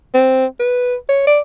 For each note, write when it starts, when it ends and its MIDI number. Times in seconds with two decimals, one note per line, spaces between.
0.14 0.46 60
0.59 0.95 71
1.09 1.23 73
1.27 1.40 74